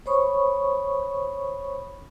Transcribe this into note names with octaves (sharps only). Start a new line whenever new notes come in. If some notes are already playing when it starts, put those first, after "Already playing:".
C5 C#5 B5 C#6 D#6